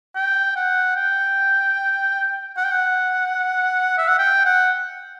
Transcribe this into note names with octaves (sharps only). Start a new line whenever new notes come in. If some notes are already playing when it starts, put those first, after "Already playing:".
G5
F#5
G5
F#5
G5
F#5
E5
F#5
G5
F#5